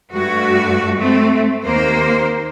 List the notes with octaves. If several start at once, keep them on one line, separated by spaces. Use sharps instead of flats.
G2 A3 F#4
A3 C4
D#2 A#3 C5